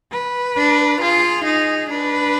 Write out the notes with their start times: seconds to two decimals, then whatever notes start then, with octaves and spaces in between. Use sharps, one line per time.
0.12 B4
0.57 D4
1.01 F4 G#4
1.46 D#4
1.91 D4 B4